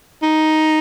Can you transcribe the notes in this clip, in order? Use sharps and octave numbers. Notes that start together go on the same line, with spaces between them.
D#4